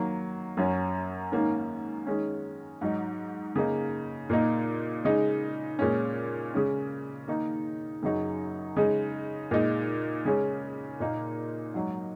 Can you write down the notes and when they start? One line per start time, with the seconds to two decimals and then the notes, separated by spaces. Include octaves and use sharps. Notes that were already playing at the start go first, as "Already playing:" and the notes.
Already playing: D#3 F#3 A#3
0.57 F#2 F#3 C#4
1.32 G#2 D#3 A#3 C#4
2.06 D#3 G#3 C#4
2.81 G#2 F#3 D#4
3.56 C#3 A#3 D#4
4.30 A#2 A#3 D#4
5.04 C#3 G#3 D#4
5.79 A#2 G#3 C#4
6.54 C#3 G#3 C#4
7.28 D#3 A#3 D#4
8.02 F#2 C#3 F#3 D#4
8.76 C#3 G#3 D#4
9.51 A#2 G#3 D#4
10.25 C#3 G#3 C#4
11.00 A#2 A#3 D#4
11.74 G#2 F#3 D#4